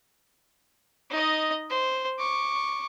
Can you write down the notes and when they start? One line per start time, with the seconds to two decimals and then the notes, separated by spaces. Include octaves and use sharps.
1.11 D#4 D#5
1.70 C5
2.19 C#6 D6